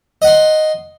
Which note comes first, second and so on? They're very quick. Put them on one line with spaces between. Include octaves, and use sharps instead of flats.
D#5 F#5 C6